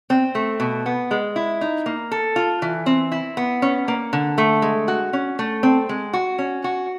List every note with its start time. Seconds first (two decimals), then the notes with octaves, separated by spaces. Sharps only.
0.10 C4
0.35 A3
0.60 B2
0.86 B3
1.11 G#3
1.36 E4
1.61 D#4
1.86 A#3
2.11 A4
2.36 F4
2.62 E3
2.86 C4
3.12 E4
3.37 B3
3.62 C#4
3.88 A#3
4.13 D3
4.38 A3
4.62 G#3
4.88 F#4
5.13 C#4
5.39 A3
5.63 C4
5.89 G#3
6.13 F#4
6.39 C#4
6.64 F#4